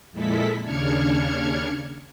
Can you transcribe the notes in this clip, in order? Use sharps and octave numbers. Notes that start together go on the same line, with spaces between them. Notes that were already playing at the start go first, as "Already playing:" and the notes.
F2 A#2 G#3 E4 A4 B6
D#2 C#3 D4 F6 G#6 C#7